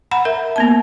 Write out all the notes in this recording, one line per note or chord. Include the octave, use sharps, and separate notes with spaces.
F#5 A#5 B5
A#4 E5
A#3 B3 A5